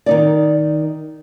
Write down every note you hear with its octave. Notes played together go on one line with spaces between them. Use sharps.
D#3 D#4 D5